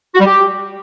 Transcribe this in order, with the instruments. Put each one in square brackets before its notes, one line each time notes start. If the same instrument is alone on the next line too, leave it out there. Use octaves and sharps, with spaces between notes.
[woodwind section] F#4
G3
G4